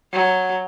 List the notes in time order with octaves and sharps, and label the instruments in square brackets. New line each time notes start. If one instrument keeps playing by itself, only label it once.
[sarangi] F#3